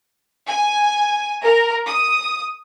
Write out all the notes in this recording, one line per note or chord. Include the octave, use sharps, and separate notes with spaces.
G#5
A#4
D#6